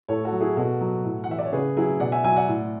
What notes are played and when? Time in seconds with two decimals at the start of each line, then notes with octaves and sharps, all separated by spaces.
0.08 A2 A4 C#5
0.25 F#4 A4
0.32 F#3
0.41 E4 G#4
0.56 B2 F#4 A4
0.81 F#3
1.04 A2
1.24 F#5
1.28 E3 E5
1.38 D5
1.45 C#5
1.52 C#3 G#4 B4
1.77 F#3 E4 G#4
2.00 B2 D5 F#5
2.12 E5 G#5
2.24 F#3 E5 G#5
2.36 D5 F#5
2.48 A2